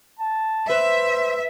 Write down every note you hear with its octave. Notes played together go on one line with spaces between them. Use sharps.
A5
B4 C5 E5